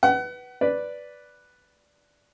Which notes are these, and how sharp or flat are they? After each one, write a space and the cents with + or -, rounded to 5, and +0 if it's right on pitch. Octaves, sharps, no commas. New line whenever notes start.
B4 +0 F#5 +30
B4 +0 D5 -5